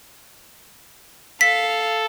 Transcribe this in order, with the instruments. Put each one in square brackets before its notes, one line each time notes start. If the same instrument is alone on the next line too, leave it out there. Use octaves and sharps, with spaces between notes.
[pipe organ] A4 [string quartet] F5 [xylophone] B6